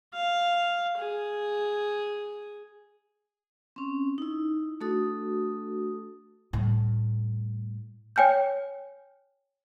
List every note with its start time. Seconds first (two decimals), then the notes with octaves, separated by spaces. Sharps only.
0.14 F5
0.98 G#4
3.76 C4 C#4
4.18 D#4 E4
4.81 A3 D4 F#4 A4 D#6
6.53 A2 G3
8.16 C#5 G5 G#5 F6 G6